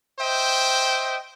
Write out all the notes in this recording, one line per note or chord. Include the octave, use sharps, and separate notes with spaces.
C5 D#5 E5 G5